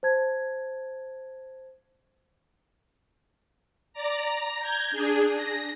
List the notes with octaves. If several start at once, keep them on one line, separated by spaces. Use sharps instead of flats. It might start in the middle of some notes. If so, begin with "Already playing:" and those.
C5 A5 G#6
D5 A#5
A#5
G6 G#6
D4 G#4
A#6